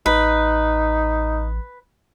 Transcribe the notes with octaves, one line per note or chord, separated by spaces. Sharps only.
A1 D#4 B4